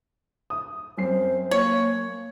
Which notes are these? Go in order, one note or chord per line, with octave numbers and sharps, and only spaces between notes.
D#6
F#2 C4 C5 C7
A#3 C#5